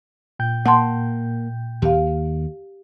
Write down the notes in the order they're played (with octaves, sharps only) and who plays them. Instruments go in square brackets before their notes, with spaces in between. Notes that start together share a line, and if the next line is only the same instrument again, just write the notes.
[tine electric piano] A#2 G5 G6
[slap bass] A#3 [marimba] F#5 A5 C6
[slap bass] D#2 [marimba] G4 F5